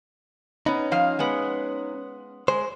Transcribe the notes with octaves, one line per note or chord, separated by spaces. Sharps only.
B3 C#4 D#4
F3 F5
G#3 B3
G#3 C5